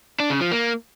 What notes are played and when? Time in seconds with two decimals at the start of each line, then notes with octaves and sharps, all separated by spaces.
0.20 D4
0.30 C#3
0.41 F3
0.51 A#3